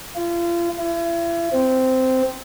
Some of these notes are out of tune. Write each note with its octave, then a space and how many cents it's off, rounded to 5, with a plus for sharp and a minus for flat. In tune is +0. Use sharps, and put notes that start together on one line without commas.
F4 -35
E4 +40
C4 -10